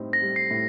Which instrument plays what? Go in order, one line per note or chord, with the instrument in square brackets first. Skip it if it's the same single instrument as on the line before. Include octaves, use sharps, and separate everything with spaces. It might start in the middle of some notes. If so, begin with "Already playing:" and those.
Already playing: [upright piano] A2 G3 C4 D#4
[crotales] A#6
[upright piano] G3
[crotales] C7
[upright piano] A2